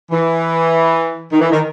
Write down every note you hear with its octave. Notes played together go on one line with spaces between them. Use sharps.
E3
D#3
E3
D#3